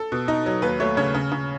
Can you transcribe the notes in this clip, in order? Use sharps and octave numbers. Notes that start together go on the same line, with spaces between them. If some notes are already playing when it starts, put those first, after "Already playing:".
Already playing: A4
B2
D#4
F#3
D#2 B4
A3 C#5
C#3 C#5
C#3
C#3